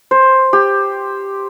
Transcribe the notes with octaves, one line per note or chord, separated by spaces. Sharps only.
C5
G4